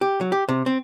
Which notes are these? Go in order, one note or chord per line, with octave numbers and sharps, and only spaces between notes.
G4
F#3
G4
C3
C4